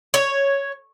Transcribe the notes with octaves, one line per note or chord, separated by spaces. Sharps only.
C#5